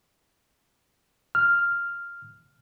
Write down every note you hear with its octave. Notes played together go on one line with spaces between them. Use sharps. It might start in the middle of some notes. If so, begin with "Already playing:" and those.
F6